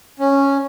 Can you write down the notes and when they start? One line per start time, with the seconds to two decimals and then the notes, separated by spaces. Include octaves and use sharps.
0.19 C#4